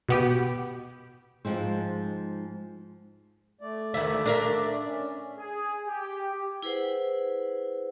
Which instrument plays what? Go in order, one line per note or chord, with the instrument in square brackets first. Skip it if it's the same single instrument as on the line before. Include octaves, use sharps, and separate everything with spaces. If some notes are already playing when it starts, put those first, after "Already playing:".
[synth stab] B2 B3 G4
[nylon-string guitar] G#2 F3 G#3 C4
[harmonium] A3 D5
[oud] D2 D#3 E5
D4 A#4 E5
[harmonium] C#4
[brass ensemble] G#4
G4
[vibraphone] E4 G#4 B4 C5 F#5